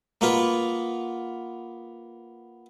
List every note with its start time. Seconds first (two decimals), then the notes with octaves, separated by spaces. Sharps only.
0.21 A#3 B3 F4